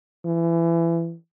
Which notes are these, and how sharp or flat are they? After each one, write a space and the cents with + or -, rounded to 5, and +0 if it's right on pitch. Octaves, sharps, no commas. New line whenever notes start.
E3 +25